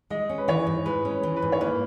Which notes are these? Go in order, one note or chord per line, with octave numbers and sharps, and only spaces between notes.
G#3 D#5
C#4
B4
E3 C#5
G#2
G#3 B4
C#4
B4
E3
B4
G#2
C#5
A#3 B4